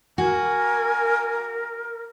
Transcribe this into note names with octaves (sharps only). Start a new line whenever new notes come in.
F#4 A#4 G#5